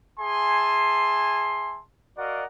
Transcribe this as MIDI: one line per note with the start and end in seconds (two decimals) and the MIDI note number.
0.19 1.81 68
0.19 1.81 76
0.19 1.81 80
0.19 1.81 81
0.19 1.81 84
2.17 2.43 66
2.17 2.43 70
2.17 2.43 74
2.17 2.43 75
2.17 2.43 77
2.17 2.43 78